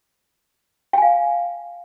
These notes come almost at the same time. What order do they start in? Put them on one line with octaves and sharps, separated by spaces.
G5 G#5 F5